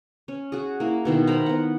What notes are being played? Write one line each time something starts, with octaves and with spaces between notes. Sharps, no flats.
C#4
F#4 G#4
A#3 E4
B2 D#3 E4
A#4 C5 A#5 B5
B3 F#5